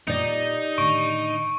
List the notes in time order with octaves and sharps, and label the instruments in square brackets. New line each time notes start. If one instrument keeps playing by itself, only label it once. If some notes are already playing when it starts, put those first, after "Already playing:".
[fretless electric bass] A#2 [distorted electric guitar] D#4 [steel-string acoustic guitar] G4 D5
[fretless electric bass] A2 D3 D#3 [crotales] C#6 D7